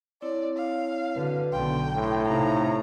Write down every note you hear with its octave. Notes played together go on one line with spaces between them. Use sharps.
C4 E4 C#5 D5
F5
D3 F#4 B4
B1 D3 B3 G5 B5 C6
A2 C6
C3 D#4 A4 F5 A#5